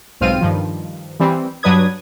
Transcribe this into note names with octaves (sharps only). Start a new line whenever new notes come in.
B1 G#2 C4 F4 F6 D#7
G2 D#3 F3
E3 G3 C4
G2 F#3 D4 B4 D#6 G#6